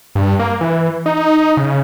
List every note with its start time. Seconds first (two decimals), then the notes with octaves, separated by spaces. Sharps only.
0.15 G2
0.39 A#3
0.61 E3
1.06 D#4
1.57 C#3